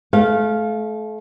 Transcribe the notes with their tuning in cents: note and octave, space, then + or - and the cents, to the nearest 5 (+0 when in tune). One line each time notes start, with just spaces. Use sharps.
A3 -35 F5 +0